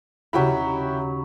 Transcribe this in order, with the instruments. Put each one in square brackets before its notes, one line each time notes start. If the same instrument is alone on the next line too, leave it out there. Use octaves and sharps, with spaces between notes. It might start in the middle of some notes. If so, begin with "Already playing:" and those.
[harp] D#2 C#3 [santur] F#3 B5 [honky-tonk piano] E4 F#4 G4